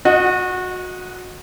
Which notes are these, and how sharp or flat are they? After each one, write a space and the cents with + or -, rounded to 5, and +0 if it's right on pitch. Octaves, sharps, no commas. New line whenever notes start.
F#4 -25 D#5 +0 F#5 +0